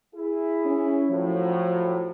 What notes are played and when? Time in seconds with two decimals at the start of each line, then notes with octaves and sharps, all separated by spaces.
0.15 E4 G#4
0.65 C#4
1.11 A2 F3 F#3